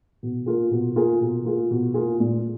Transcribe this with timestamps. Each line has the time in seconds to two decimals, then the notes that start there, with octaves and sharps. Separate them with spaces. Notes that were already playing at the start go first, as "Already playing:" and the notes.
0.23 B2
0.46 A#3 F4 G#4
0.71 B2
0.96 A#3 F4 G#4
1.21 B2
1.45 A#3 F4 G#4
1.71 B2
1.94 A#3 F4 G#4
2.20 A#2